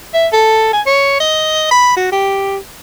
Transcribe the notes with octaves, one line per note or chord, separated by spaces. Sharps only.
E5
A4
G#5
C#5
D#5
B5
F#4
G4